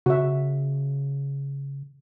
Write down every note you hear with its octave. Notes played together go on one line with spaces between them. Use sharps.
C#3 F#4 E5